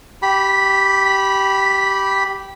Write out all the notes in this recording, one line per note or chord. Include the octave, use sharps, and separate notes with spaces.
G4 B5